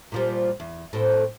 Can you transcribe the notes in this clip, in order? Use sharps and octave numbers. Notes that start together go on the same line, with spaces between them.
A#2 F3 G3
E2
A2 C4